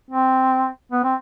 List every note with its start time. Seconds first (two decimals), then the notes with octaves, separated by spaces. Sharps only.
0.11 C4
0.92 B3
1.04 C4